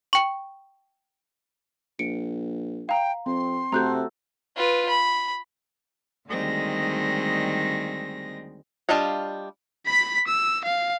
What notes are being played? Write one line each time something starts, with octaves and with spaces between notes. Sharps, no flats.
G5 C#6
A#1 C#7 D7
F5 G5 A#5
F2 C4 C6
C3 A3 F#4 A4 A#5 F#6 G6
F4 B4
B5
D2 D#3 G3 G#3 C4 A#6
G3 D4 F4 D#5 F5
B5 B6
E6
F5